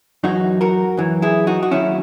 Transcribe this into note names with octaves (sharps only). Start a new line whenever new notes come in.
F#2 E3 D#4 F#4
F#4 A#4
F#2 E3
E4 G#4
D#4 F#4
F#4
D#2 D#3 F#3 C#4 E4